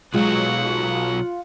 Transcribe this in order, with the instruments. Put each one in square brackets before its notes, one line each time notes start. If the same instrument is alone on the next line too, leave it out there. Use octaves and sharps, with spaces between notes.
[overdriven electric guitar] B1 F#3 [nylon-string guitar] G#3 [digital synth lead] F4 [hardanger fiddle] F#5